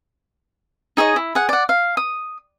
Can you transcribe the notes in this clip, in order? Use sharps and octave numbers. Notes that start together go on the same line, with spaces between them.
D#4 G#4 C#5 D#5
E4
G#4 F#5
D5 F#5
F5
D#6